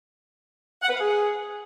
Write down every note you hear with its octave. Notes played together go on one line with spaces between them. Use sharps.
F#5
B4
F5
G#4